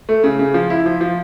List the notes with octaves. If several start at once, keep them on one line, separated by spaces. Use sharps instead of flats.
A3
C#3
C#3
F3
E4
F3
F3